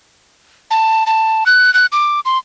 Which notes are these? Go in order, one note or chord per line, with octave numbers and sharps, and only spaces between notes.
A5
A5
F#6
F#6
D6
C6